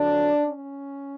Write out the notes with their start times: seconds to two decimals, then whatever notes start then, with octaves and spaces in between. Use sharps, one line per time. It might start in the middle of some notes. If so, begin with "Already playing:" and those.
Already playing: F2 D3 F#3 D4
0.46 C#4